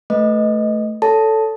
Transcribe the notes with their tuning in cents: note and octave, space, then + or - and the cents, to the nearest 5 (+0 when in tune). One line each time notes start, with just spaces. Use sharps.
A3 +0 B4 +0 D#5 +0
A4 +0 C#5 +25 A5 +0